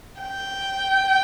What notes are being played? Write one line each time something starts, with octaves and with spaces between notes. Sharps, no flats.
G5